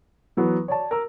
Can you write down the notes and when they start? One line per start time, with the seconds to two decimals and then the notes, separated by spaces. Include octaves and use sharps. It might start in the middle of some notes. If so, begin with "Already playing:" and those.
0.37 E3 F#3 B3
0.68 C#5 D5 A5
0.91 A#4 E6